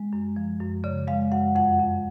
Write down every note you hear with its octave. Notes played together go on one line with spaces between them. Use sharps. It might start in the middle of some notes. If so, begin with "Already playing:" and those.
Already playing: G#3
F#2
F3
F#2
C#3 D5
G#3 F5
F#2 F#5
F2 F#5
F2